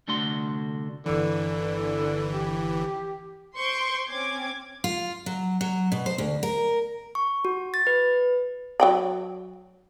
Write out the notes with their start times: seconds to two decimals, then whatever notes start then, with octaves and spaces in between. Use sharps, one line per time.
0.08 C2 D3 A3 D4 F#4 C6
1.06 G1 D3 E3
2.34 G4
3.56 C5 C6 C#6 G6 D7
4.09 C4 C#4 D6 G#6
4.84 F4
5.26 F#3
5.61 F#3
5.92 B2
6.06 C5
6.18 D2
6.43 A#4
7.15 C#6
7.45 F#4
7.74 A6
7.87 B4
8.80 F#3 G5 B5